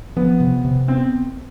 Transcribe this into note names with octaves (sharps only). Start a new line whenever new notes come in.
F3 B3
C3
C3
B3 C4